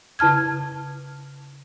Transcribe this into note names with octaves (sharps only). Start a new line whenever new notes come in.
C#3 E4 A5 F6 G#6